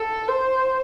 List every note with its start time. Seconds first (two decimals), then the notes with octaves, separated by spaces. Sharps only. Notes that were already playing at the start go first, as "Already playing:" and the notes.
Already playing: A4
0.28 C5